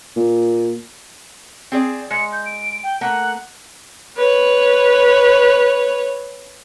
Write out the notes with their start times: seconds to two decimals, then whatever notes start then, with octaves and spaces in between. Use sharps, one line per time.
0.16 A#2
1.72 C4 G#4 D5
2.11 G#3 C#7
2.32 G6
2.46 D7
2.84 G5
3.01 A3 A#3 F#5
4.17 B4 C#5